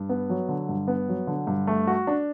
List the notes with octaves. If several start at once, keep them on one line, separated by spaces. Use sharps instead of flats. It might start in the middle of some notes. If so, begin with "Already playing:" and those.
Already playing: G2
B3
F#3
D3
G2
B3
F#3
D3
G2
A3
F#4
D4